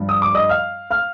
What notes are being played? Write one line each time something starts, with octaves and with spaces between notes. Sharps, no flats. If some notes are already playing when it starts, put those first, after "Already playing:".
Already playing: G2 F3
D#6
D6
D#5 D#6
F5 F6
F5 F6